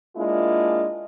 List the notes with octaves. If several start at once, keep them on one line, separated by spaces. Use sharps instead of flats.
G#3 A#3 D4 E4 F4